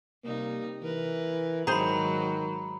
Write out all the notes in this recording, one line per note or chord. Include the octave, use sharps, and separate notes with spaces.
C3 G3 A#3 D#4
E3 A#4 B4
G#2 D#3 F#3 G#4 C5 A#5 B5